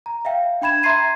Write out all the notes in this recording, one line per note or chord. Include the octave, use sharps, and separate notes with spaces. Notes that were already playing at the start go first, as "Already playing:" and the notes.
A#5
E5 F5 G5
D4 G5 B5 G#6 E7
E5 A#5 C6 G#6 C7 D#7